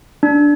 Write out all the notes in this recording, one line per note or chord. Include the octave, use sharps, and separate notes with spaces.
D4